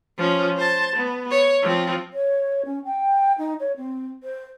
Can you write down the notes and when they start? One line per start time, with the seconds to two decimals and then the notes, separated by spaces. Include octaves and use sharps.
0.18 F3 C#4
0.57 C5 A5
0.96 B3
1.31 C#5
1.62 F3 C4
2.13 C#5
2.65 C#4
2.85 G5
3.38 D#4
3.60 C#5
3.77 C4
4.23 C5